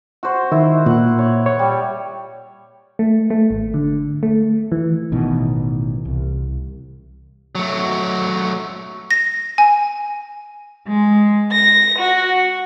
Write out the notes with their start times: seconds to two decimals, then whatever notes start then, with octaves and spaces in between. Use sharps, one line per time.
0.23 F#4 C5 C#6
0.52 D#3 E4
0.86 A#2 F#5
1.19 C#5
1.46 C#5
1.59 G3
2.99 A3
3.30 A3
3.51 G#1
3.74 D3
4.23 A3
4.72 E3
5.12 A1 B2 D#3 E3
6.05 C2
7.55 F#3 A3
9.11 A#6
9.58 G#5
10.89 G#3
11.51 A#6
11.99 F#4